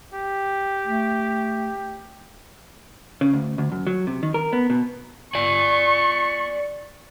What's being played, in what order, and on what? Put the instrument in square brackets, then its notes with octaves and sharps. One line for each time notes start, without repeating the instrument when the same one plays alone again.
[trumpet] G4
[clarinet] A3
[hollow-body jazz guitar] C#3
D2
D2
F#2
F#3
C3
D#3
A#4
B3
B2
[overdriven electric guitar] D5 G#5 [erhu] C#6